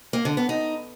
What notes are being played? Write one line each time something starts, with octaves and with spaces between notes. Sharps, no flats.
A#3
D3
B3
D#4